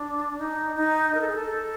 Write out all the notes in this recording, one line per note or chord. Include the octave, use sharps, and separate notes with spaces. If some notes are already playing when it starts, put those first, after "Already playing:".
Already playing: D4
D#4
D#4
A#4
A4
G#4
A4